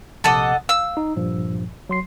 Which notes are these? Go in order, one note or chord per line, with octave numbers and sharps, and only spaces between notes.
A#1 C3 A4 D#5 F#5 D6
F5 E6
D#4
G2 A#2 F3
F#3 C6 C7